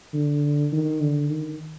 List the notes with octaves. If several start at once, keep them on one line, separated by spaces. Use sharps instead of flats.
D3
D#3
D3
D#3